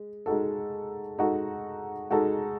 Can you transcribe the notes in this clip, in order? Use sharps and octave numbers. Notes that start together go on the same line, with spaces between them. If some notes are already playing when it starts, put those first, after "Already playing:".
Already playing: G#3
G#3 D#4 F#4 A4
G#3 D#4 F#4 A4
G#3 D#4 F#4 A4